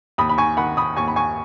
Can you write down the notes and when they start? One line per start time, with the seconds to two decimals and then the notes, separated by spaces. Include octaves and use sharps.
0.18 D#2 B5 D#6
0.29 B5
0.38 G#5 C#6
0.57 D#3 F#5 B5
0.77 B5 D#6
0.96 D#2 G#5 C#6
1.08 B5
1.16 G#5 C#6